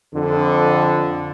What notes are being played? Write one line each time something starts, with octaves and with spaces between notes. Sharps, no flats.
F2 D3